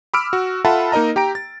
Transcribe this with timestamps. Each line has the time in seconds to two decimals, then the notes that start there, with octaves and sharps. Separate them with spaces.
0.14 B5 D6 E6 F6 D7
0.33 F#4
0.65 F4 A4 E5 F#5 A5 B5
0.92 A#3 D#4 A#4 D#5 A#5
1.16 G4 G5 A#5 D7
1.35 A6